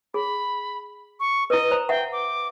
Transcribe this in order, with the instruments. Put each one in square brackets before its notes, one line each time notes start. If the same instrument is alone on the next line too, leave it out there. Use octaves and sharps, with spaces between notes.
[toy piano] G#4 [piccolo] B5
[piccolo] C#6
[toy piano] E4 B4 [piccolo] D#5
[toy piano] C5 A#5
[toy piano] E5 F#5 [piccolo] G5
[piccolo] D6